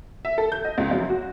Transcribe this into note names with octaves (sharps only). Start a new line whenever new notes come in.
E5
A4
G6
D#5
C#2
F#2
F#4